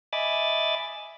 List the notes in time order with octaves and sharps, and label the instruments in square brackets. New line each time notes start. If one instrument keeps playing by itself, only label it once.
[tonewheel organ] D#5 E5 G#5 B5 D6 A6